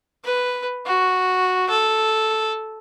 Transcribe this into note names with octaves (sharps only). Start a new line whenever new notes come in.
B4
F#4
A4